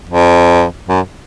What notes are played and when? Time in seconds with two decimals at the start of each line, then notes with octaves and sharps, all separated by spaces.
0.10 F2
0.89 F#2